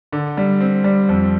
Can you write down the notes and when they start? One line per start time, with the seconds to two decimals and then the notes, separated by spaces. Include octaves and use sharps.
0.12 D3
0.37 G3
0.61 C4
0.84 G3
1.09 F2